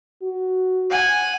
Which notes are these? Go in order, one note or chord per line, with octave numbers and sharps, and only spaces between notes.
F#4
F#5 G#5